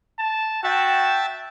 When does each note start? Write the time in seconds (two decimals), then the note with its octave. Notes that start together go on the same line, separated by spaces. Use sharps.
0.19 A5
0.63 F#4 E5 G5 A5